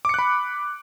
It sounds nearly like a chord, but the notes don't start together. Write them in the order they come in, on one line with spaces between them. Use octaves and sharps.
D6 C#7 F#6 B5